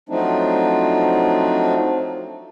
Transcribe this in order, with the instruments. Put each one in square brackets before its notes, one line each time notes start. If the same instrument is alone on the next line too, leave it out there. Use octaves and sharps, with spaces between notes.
[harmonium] F3 F#3 A3 C4 D4 D#4